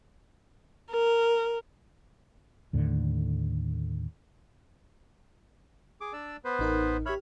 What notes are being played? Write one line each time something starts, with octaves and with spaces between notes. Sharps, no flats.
A#4
D#2 A2 D3
G#4 D6
D4 D5 E6
B3 B4 C5
A1 D#4 A#4
G4 C#5 E5 B5 F6